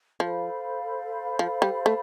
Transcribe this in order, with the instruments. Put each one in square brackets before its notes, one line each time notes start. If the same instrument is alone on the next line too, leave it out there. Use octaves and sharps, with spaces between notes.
[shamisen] F3 [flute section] A4 C5 F5 B5
[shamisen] F3
G3
A3